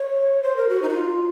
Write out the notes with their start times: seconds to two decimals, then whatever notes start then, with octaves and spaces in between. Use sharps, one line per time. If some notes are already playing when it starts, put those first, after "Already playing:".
Already playing: C#5
0.43 C5
0.57 A#4
0.69 F#4
0.82 D#4
0.89 F#4
0.94 F4